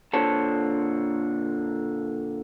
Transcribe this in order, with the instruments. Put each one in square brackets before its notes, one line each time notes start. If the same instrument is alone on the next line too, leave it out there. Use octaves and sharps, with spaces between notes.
[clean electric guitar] A#2 D3 C5 C#5 A5